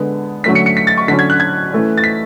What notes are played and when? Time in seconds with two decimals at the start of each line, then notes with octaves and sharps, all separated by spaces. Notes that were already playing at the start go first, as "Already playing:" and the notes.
Already playing: D3 G#3 B3
0.44 D3 F#3 A3 C#4 B6
0.55 C#7
0.66 C#7
0.77 B6
0.87 A6
0.97 C#6
1.08 D3 F#3 C#4 B6
1.19 G#6
1.30 F#6
1.40 G#6
1.72 E3 A3 C#4
1.97 A6
2.04 B6